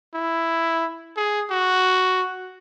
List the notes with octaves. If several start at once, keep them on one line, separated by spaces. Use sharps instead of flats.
E4
G#4
F#4